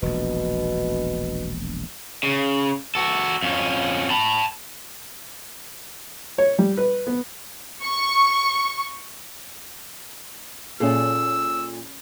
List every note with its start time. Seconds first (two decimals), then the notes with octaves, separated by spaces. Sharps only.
0.02 E1 A#1 B2
2.23 C#3
2.95 F#4 A4
3.43 F2 C#4
4.10 A5 B5
6.38 C#5
6.59 G3
6.77 B4
7.07 B3
7.83 C#6
10.80 A#2 C#4 G#4 A4 E6